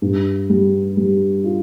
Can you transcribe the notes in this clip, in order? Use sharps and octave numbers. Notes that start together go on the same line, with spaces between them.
G2
G3
G3
F4